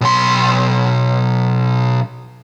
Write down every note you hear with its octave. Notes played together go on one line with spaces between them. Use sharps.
B1 C6